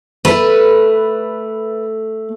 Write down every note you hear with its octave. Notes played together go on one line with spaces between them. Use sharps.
A3 B4